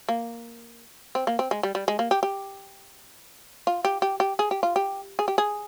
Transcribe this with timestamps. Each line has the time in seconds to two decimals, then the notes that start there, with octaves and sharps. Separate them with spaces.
0.09 A#3
1.15 C4
1.27 A#3
1.39 C4
1.51 G#3
1.63 G3
1.75 G3
1.88 G#3
1.99 A#3
2.11 G4
2.23 G4
3.67 F4
3.85 G4
4.02 G4
4.20 G4
4.39 G#4
4.51 G4
4.63 F4
4.76 G4
5.19 G#4
5.28 G4
5.38 G#4